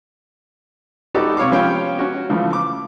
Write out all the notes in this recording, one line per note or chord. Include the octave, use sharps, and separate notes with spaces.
D#4 F#4 G4 A4 B4 D5
C3 C#5 F5 D6
F3 B3 C#4 G4 F5 G5
C#4 F#4
C#3 E3 F3 A3
D6